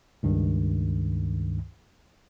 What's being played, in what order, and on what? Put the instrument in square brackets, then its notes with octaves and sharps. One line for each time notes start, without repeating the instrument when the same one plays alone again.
[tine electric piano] C#2 G2 D#3